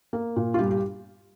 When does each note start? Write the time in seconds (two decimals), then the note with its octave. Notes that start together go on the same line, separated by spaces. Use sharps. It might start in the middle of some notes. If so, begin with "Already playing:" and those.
0.13 A#3
0.36 A#2
0.54 F4
0.59 G2 G4
0.71 G4